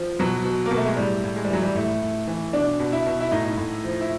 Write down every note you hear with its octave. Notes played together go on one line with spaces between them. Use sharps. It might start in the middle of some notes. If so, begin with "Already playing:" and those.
Already playing: F3
B2 F#3
B2
A#3
B2
A3
G#3
A2 G3
A2
G#3
G3
E3 F#3
G3
A2 A3
A2
E3
B2 D4
B2
E4
B2
E4
A2 D#4
A2
F3
E4